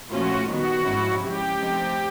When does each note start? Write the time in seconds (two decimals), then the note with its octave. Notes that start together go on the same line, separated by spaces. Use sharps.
0.11 A#2 F3 A3 C#4 F4 F#4
0.48 D#3 G3 B3 F#4
0.85 G#2 F3 G#3 C#4 E4
1.22 C#3 F3 G#3 G4
1.59 F3 A3 C4 D#4